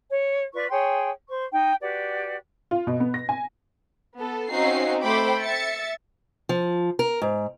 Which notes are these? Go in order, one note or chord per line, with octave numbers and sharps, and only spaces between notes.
C#5
F4 B4 D5 C#6
G#4 C#5 G5 C6
C5 C#6
D#4 G5
F#4 G4 B4 D5
F4
B2
B3
A#6
G#5
B3 A4
C4 C#4 D#4 F#4 F5 C7
A3 C4 C5 G5 B5 D6
E5 A6 C#7
F3
A#4
G#2